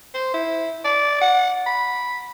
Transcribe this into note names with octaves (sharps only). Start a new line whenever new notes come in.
C5
E4
D5
F#5
B5